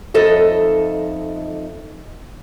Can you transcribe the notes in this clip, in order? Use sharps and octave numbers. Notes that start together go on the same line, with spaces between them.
F2 D#4 A4 D#5 E5